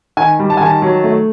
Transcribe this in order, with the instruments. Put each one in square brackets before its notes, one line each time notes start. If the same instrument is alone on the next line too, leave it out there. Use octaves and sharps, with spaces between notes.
[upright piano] D#3 G#5
G3
A5
G#5
D#3 A5
F#3
A3